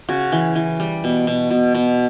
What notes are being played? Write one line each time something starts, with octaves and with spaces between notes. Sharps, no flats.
C#3 F#4
E3
E3
G3
B2
B2
B2
B2